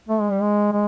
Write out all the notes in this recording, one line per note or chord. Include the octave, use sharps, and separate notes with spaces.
A3
G#3
G3
G#3
G#3